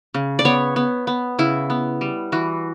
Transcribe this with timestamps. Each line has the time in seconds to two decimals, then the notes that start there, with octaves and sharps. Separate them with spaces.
0.14 C#3
0.39 D5
0.45 B3 C#5
0.76 B3
1.07 B3
1.39 C#3 E4
1.70 B3
2.01 G3
2.32 E3 F#4